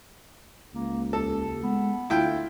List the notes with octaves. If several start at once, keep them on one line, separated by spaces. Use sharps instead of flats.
C#2 A#3
D#2 A4
G#3 B3
D2 E4 F4 G5